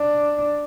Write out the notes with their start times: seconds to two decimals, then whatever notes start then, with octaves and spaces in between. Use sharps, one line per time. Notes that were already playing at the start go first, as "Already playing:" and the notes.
Already playing: D4